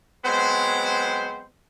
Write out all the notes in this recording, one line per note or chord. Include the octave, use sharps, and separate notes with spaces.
F#3 G#3 B3 C4 C5